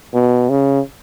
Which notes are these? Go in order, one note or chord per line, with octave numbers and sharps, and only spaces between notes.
B2
C#3